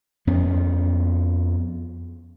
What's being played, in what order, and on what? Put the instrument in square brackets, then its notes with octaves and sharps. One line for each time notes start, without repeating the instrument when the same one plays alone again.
[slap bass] F2 B3 C#4